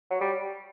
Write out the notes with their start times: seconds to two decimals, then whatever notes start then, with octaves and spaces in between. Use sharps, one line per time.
0.10 F#3
0.21 G3